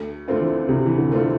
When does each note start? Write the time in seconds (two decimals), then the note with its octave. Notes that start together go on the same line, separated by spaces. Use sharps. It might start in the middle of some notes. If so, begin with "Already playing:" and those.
Already playing: D2
0.28 D3 A3 C4 F4
0.41 E3
0.68 D2 C3
0.86 E3
0.98 D3
1.11 D3 A3 C4 F4